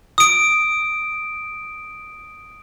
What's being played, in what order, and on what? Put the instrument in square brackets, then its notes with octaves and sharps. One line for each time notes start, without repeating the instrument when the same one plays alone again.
[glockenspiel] D#6 D7